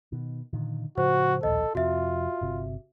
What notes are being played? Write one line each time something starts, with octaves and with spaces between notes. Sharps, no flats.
B2 D#3
A#2 D3 D#3
A2 C#3 F3 F#4 C5
D1 A#1 D#2 A4 D#5
F2 C3 F4 F#4 E5
G1 C3